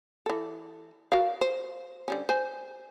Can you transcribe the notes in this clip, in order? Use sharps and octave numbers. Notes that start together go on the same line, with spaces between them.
E3 A4
F#4 A#4 F5
C5
D3 G3 C#4
C5 G#5